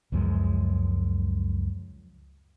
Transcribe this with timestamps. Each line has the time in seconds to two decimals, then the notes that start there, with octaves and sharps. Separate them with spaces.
0.12 C#2 F#2 F3 G#3